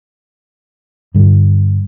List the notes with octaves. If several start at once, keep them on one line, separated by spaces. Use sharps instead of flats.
G2 D3 G3